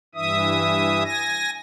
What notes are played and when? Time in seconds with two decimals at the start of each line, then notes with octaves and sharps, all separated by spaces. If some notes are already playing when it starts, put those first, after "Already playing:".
0.15 G2 E3 E5 D#6
1.04 G#5 A#6